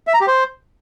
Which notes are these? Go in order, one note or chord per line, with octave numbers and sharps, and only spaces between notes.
E5
A#5
G4
C5